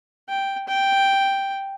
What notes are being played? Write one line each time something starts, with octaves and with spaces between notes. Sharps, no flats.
G5
G5